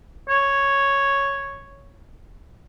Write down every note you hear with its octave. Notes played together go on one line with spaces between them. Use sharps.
C#5